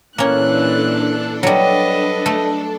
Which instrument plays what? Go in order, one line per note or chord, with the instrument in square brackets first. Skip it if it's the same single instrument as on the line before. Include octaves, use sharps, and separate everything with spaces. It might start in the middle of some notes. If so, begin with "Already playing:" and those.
[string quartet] A#2 E3 F#6 [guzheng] A#3 C#4 [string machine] D4 A4
[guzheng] F#3 G3 [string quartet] B4 D#5
[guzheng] A3